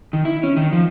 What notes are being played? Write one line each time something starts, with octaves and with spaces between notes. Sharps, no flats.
D#3
E4
C#4
D#3
F3